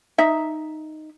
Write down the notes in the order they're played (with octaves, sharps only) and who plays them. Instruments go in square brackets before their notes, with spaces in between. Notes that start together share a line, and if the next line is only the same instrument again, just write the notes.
[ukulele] D#4 E5